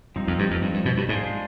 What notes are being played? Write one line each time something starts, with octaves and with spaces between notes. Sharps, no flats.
G2 F3 C4 D#4
F2
G2
F2
G2
G2
B2
G2
G#2 G#3 D4 F4 G#4 C5